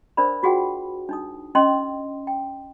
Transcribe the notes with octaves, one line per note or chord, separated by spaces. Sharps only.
D4 A#4 C5 D5 B5
F4 F#4 G#4 F#5 G5
D4 D#4 D#6
C#4 D#5 G5 C6 E6
G5